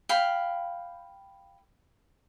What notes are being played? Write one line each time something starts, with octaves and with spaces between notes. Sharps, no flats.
F5 G5 B5